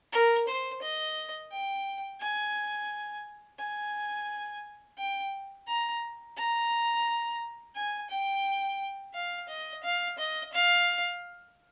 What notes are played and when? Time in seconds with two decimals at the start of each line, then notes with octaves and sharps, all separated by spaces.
0.12 A#4
0.48 C5
0.82 D#5
1.52 G5
2.21 G#5
3.59 G#5
4.98 G5
5.67 A#5
6.37 A#5
7.75 G#5
8.10 G5
9.14 F5
9.49 D#5
9.83 F5
10.18 D#5
10.53 F5